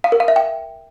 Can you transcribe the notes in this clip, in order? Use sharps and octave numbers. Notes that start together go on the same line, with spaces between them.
F5
A#4
F5
E5
G5